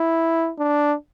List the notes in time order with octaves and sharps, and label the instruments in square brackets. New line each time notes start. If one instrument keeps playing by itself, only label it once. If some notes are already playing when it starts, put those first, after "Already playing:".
Already playing: [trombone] E4
D4